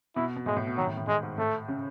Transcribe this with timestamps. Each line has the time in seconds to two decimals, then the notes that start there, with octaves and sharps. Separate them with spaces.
0.16 B2 E4
0.36 B2
0.46 A2 G#3
0.56 A2
0.67 B2
0.77 D#3 F#3
0.87 A2
0.97 A2
1.07 A2 G#3
1.23 G#2
1.38 A2 A3
1.68 C#3